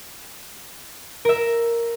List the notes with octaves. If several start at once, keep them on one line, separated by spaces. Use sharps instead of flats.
A#4 E5